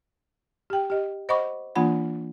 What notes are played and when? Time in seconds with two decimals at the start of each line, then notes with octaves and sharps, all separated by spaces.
0.70 G4 G5
0.90 G4 D#5
1.29 C5 D#5 F#5 B5 C#6 D6
1.75 E3 A#3 D4 F4 F#5 B5